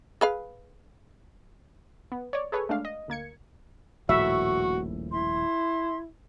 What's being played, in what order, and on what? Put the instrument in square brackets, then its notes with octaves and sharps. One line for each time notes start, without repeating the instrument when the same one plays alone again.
[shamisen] G#4 B4 F5
[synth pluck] B3
C#5 D5
G#4 A4 B4 C#5
G#3 A3 D4 F5
D#5
D2 A#3 G#6 C#7
[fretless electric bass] D#1 A#1 A2 [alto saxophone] F#4 [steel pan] E5 [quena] C#6
[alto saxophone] E4 [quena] C6